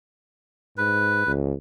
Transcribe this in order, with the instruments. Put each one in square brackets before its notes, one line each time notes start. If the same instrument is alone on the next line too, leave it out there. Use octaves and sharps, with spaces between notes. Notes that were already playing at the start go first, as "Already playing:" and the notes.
[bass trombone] G#2 [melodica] B4
[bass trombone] C#2